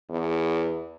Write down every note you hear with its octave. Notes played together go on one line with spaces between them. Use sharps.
E2